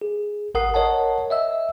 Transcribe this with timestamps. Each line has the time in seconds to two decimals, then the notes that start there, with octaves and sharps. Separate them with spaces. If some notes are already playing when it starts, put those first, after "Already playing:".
0.01 G#4
0.54 A1 A#4 F#5 D#6 C7
0.74 A#4 C#5 D#5 F#5 A5
1.30 D#5 E5 E6